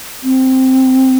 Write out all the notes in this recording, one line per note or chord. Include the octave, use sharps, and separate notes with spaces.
C4